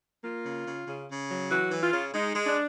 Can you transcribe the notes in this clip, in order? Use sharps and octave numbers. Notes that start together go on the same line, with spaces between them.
A#3 F4
C#3
C#3
C#3
C#3
F#3
E3 F#4
E3
F4
C#3
G#3 D#4
G#3
D4